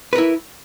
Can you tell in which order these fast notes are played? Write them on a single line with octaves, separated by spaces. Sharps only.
B4 A#4 E4